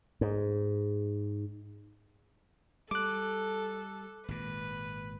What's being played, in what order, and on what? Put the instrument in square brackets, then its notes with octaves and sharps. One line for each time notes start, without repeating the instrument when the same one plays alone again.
[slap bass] G#2
[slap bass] G3 [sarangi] A4 [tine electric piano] D6 F#6
[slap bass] G#1 A#2 [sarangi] B4